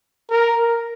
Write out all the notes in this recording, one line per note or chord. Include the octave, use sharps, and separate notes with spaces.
A#4